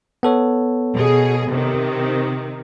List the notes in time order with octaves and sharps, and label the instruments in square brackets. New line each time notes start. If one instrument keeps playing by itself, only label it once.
[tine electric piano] B3 A4 C#5
[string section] B2 G#4
C3 D#3